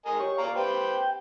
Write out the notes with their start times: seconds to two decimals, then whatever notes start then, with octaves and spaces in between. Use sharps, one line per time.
0.06 A#4 D#5 G#5
0.20 G4 C#5 C#6
0.38 D5 F5 A#5
0.55 G4 B4 C5 G5